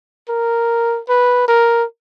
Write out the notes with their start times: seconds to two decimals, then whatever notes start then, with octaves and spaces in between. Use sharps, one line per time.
0.29 A#4
1.09 B4
1.48 A#4